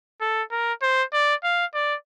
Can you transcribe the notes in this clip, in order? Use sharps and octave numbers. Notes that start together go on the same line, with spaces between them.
A4
A#4
C5
D5
F5
D5